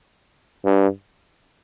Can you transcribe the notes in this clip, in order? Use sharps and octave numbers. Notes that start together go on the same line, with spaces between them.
G2